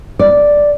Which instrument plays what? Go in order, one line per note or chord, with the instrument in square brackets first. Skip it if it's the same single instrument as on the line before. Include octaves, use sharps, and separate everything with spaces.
[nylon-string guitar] D5